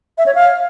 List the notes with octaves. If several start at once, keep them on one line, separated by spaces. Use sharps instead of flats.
E5
C#5
F5